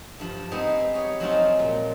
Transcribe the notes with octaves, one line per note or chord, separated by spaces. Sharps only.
G2 F3
G#3 B3 C4 D#4
G4 G#4 C#5
F3 F#3 G#3 C4 D#4 F4
A#2